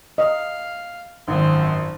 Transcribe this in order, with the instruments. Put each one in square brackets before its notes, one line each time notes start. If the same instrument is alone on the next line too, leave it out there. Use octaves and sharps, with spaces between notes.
[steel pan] D#5 [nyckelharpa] F5
[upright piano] G#1 [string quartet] F#2 F3 C4 [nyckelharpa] C6